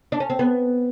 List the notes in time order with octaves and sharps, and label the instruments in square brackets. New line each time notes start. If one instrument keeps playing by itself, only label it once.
[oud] D4
C#4
C4
B3